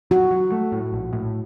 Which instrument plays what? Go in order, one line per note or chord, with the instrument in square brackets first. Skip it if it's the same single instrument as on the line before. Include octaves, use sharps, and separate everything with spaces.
[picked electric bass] F#3 [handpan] F#4
[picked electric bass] F#3
A3
A2
A#1
A2